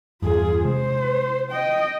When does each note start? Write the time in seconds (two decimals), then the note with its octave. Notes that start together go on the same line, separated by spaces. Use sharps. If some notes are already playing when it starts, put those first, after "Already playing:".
0.22 E2 G2 F4 G#4
0.64 C3 G#3 C5
1.51 D#5 G5